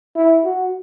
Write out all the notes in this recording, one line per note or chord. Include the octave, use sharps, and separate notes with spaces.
E4
F#4